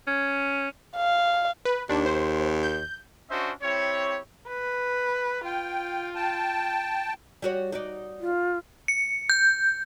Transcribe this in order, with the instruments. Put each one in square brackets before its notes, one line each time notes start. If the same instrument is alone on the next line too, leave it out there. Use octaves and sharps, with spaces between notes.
[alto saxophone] C#4
[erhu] F5
[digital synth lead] B4
[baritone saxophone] D#2 [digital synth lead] D4
[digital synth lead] C5
G6
[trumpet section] C#4 D4 F#4 C5 D#5 E5
C4 E4 G4 C#5
[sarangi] B4
[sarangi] F4 [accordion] G5
[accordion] G5 A5
[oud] G3 F#4 C#5
D#4 F#4 D5
[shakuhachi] F4
[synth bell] C#7
G6